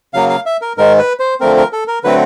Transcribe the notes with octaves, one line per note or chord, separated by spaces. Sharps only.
C#3 F#3 A#3 F5
F5
E5
A#4
G#2 D#3 G#3 A#4
B4
C5
D3 F3 A3 C4 A#4
A#4
A4
A#4
D3 F#3 A3 C4 B4